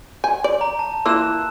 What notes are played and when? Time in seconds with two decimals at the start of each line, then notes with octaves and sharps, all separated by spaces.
0.24 G#5 G6
0.44 D5
0.61 A#5
0.79 A5
1.06 E3 A#3 F4 E6 F#6 E7